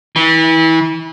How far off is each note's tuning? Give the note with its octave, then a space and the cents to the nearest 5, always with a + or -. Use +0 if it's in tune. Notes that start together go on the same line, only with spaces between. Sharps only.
E3 -30